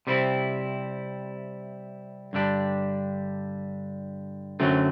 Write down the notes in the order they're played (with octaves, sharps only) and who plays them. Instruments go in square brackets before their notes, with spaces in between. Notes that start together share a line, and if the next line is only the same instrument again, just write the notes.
[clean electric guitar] C3 G3 C4 E4
G2 D3 G3 D4
F#2 D3 F#3 A3 C4